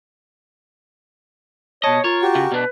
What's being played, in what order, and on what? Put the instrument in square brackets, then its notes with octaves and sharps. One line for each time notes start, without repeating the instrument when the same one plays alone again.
[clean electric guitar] B2 A5 [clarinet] C#5 [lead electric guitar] D#5
[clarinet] F4 [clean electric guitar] A#4 [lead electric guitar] C#5
[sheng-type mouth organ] F#4 G4 C#6
[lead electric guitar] C#3
[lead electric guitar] B2 D4 [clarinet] B4